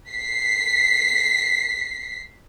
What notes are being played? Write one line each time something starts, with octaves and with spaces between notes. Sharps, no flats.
B6 C7